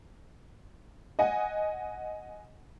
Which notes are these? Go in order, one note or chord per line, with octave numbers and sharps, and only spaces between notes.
D#5 F#5 G#5